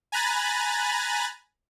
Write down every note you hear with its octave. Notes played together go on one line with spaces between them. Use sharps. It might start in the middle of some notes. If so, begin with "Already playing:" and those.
G#5 A#5 B5 F#6 A6